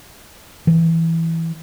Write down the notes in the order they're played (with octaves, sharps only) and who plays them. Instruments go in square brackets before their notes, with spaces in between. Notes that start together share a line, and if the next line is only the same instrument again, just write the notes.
[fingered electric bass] E3